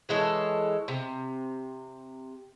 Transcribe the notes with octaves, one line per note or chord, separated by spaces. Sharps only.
E3 G#3 A4 C#5
C3